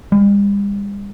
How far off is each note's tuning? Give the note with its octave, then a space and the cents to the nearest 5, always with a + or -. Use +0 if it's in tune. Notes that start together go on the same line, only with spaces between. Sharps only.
G3 +45